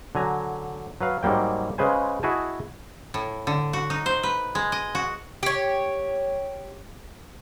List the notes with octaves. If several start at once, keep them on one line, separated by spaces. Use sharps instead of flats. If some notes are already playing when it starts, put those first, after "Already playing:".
D3 F#3 G#5 A#5
F#3 B4 F5
G#2 F#3 G3 A#3 G5
C#3 G#3 B4 C5 G#5
E4 F#4 G#4 D#5 G#5 A5
A2
D3
F#4
D#4
C5
B4
G#3
D#5
F#4
G4 C#5